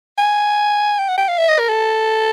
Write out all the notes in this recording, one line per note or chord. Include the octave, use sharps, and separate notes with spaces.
G#5
G5
F#5
G5
F5
E5
D#5
A#4
A4